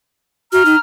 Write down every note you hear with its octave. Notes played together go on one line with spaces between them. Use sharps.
F#4 A#5 F6
D#4